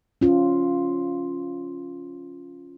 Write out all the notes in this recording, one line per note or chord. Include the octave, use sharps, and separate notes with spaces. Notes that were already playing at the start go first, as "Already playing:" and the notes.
C#4 F4